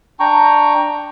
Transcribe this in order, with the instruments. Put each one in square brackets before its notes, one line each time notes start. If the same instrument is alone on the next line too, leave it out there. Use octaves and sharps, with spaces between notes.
[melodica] D4 G5 A#5 C#6